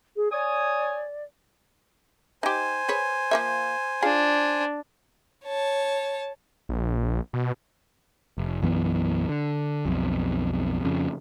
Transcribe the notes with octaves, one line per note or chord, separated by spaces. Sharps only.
G#4
C#5 D5 G#5 D#6
D#4 G4 C5 G#5
G#4 B4 C#5
F3 A#3 E5
D4 F4 G#4
C#5 A5
A#1
B2
F1
B1 F#2 E3 B3
D3
B1 F2
F2 C#3